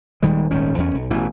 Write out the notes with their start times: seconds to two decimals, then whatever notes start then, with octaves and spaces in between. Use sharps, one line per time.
0.22 D#1 D#3 G3 G#3
0.51 D#1 G#1 D#3 C#4
0.78 E2 C#4
0.95 B1
1.11 A1 B2 E3